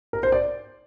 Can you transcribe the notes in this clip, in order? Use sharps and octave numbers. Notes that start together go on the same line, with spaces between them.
A#4
C5
D5